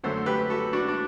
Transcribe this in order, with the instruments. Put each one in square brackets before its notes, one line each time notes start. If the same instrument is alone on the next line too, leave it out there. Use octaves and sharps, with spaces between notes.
[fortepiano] F#2 D3 F#3 A3 A4 C5
G4 B4
F#4 A4
D4 F#4
D4